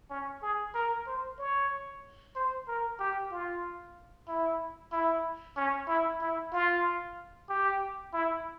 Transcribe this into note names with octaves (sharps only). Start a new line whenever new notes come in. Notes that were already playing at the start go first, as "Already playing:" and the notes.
C#4
G#4
A#4
C5
C#5
C5
A#4
G4
F4
E4
E4
C#4
E4
E4
F4
G4
E4